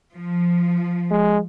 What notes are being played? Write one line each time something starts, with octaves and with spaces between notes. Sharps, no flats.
F3
G#3